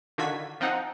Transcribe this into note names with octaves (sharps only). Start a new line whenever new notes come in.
D3 D#3 F4 F#4 G#6 B6
F3 C4 D#4 F#5